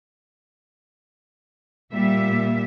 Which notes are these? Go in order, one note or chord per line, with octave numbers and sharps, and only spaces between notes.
A#2 G3 E5